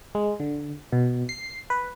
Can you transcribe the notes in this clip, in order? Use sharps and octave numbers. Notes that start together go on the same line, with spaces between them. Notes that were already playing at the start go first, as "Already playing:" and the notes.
G#3
D3
B2
C7
B4